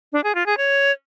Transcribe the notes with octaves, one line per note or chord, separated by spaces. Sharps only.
D4
G#4
F4
G#4
C#5